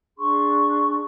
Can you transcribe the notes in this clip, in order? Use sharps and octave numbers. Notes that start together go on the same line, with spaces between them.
D4 G#4 C6 C#6